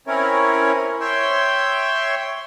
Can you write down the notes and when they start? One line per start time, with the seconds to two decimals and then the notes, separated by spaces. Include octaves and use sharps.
0.07 C4 C#4 E4 A#4 C#5
1.01 C#5 E5 G5 C6